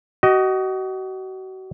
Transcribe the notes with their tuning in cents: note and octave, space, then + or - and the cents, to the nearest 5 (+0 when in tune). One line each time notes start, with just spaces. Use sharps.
F#4 +35 D#5 +0